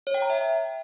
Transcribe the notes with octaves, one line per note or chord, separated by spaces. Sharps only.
C#5
G5
A#5
E5